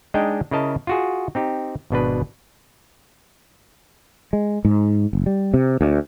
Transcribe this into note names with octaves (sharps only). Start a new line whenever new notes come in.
G#3 D4 D#4 D#5 G5
C#3 E4 A#4 D#5 A5
F4 F#4 G#4
C4 D#4 G4
G#1 B2 D4 B4
G#3
G#2
F#1
G3
C3
D2